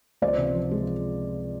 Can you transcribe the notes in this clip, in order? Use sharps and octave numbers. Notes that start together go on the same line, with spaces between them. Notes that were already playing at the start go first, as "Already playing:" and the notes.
C#2 C5 D5
C3
F3
G#3